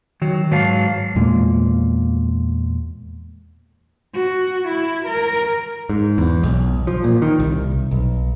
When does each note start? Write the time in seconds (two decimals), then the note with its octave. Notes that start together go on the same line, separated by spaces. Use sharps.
0.22 D#3 F#3
0.51 G#2 F#3 B4 F5 A5
1.16 E2 A#2 G#3 A#3
4.14 F#4
4.68 E4
5.06 A#4
5.89 G#2
6.18 E2
6.43 B1
6.87 F3
7.04 A#2
7.22 D#3
7.39 C2
7.91 B1